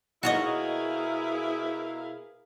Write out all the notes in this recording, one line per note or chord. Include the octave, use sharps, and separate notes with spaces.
B2 E4 F#4 G#4 A#4 C#5 D#5 F5